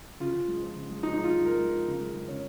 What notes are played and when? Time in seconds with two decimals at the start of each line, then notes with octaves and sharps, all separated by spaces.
0.20 C#3 F4
0.34 C#3
0.48 G#3
0.62 F3
0.75 C#3
0.90 G#3
1.03 F3 D#4
1.14 D#4
1.18 G#3
1.24 F4
1.31 G#3
1.45 G#3 A#4
1.59 G#3
1.73 F3
1.87 C#3
2.01 G#3
2.16 G#3
2.28 C#3 C#5